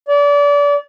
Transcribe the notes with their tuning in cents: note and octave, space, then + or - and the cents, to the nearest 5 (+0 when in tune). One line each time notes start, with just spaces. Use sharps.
D5 -30